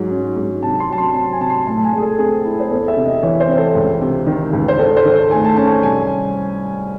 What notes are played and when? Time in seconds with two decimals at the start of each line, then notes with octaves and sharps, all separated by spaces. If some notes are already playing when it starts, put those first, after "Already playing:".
Already playing: G#2 F#3
0.11 C#4
0.36 G#2
0.63 C3 A5
0.80 C6
0.89 F#3 A5
0.98 C6
1.14 C4 A5
1.32 G#5
1.40 C3 A5
1.50 C6
1.67 A2 A5
1.84 G#5
1.93 G#3 G#4
2.02 A4
2.18 C4 G#4
2.45 E4
2.60 C5
2.70 E2 A4
2.88 E5
2.97 C3
3.05 D#5
3.23 E3 C#5
3.40 C5
3.49 C4
3.58 A4
3.75 C#2
4.01 C3
4.27 D#3
4.53 C#2
4.68 C5
4.79 G#2 A4
4.96 C5
5.05 D#3
5.13 A4
5.31 A3 G#5
5.45 A5
5.57 C#4 A5
5.70 G#5
5.83 C2 G#5